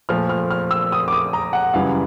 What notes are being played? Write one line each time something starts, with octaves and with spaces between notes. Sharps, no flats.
A#2 F3 A3 F6
F6
F6
E6
D#6
D6
D#6
A#5
F#5
F#2 C#3 E3 G3 F5